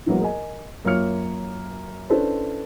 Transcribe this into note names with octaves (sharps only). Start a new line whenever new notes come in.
A2 E3 F#3 G#3 A#3 B3
A#4 D#5 G#5
F#2 A#3 F4 C#5 F6 C#7
C#4 D4 E4 A4 B4 C5